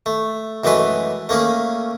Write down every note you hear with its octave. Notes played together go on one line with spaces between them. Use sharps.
A3
F#2 E3 G#3 A3 B4 C6
A3 A#3 C#4 G#4